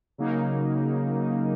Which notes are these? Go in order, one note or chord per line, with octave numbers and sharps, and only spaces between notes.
C#3 F#3 A#3 D#4